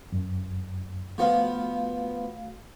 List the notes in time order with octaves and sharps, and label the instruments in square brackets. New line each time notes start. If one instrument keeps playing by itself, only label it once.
[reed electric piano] F#2
[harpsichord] F3 B3 [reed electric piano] A3 F#4 F5